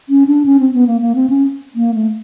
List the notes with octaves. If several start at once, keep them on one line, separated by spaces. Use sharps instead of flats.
C#4
D4
C#4
C4
B3
A#3
A#3
C4
C#4
A#3
A3